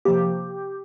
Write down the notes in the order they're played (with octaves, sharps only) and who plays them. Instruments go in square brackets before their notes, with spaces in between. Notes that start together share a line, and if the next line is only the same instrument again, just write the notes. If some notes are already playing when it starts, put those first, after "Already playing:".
[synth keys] C3 F3 A#3 G4